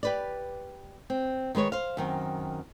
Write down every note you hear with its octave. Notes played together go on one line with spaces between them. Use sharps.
G4 B4 D5
C4
D#3 G#3 B4 C#5
C5 F5
F#2 D#3 C4